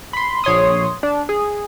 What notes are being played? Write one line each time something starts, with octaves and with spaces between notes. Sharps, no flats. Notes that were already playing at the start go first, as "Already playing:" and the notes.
B5 C6
A#1 C#5 C6 D#6
D4
G#4